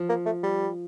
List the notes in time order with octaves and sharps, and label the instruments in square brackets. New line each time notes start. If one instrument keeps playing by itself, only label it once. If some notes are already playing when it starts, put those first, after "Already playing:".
Already playing: [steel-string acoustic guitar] F3
[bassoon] A#3
A3
G3